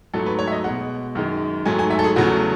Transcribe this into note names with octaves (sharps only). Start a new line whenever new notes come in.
G#2 F#3 A3 A4
B4
C#5
E5
D#5
B2 G#3 F#5
F#2 D#3 G#3
G#2 F#3 A3 G#5
G#5
E5
A4
G#4
E2 C#3 F#3 A3 F#4